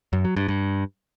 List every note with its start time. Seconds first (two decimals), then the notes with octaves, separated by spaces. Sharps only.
0.13 F#2
0.25 F#3
0.37 G2
0.48 G2